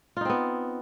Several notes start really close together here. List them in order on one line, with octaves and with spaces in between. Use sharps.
F4 D#4 C4 B3